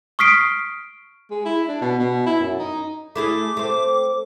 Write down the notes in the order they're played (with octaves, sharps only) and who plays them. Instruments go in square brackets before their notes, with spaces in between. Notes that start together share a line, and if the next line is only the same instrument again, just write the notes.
[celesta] C#6 D#6 F6 B6 C7 D7
[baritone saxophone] G#3
E4
D4
B2
B2
E4
F#2
D#4
[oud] A3 E4 G#4 [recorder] D6
[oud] A3 C4